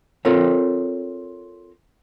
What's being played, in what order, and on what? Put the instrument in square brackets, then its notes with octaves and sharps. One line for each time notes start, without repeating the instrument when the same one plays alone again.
[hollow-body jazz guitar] C4 F4 A4 A#4 C#5